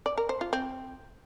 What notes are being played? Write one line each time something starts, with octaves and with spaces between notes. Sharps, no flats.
D5
A#4
C5
F4
C4